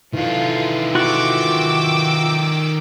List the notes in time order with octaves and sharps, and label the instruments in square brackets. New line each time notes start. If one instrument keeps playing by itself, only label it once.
[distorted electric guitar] D#3 A4 [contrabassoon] E3 [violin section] F4
[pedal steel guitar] F4 F#4 F#6 [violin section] G5 D6 E6